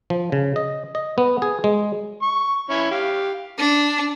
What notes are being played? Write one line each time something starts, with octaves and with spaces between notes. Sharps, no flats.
F3
C#3
D#5
D#5
B3
G#4
G#3
C#6
E3 C#4 E4
G4 F5
D4